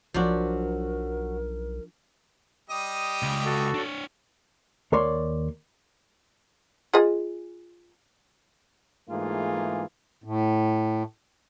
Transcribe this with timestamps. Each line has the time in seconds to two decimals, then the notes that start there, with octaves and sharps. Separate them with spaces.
0.14 B1 F3 F#3 D4 F#4 A#4
2.70 G3 G4 D#5 D#6
3.23 C#2
3.45 F#4 A4
3.74 D4 C#5
4.92 D#2 A#4 C#5 D5 C6
6.94 F4 G#4 D#5
9.10 G#2 E3 A3 A#3 F4 G#4
10.24 A2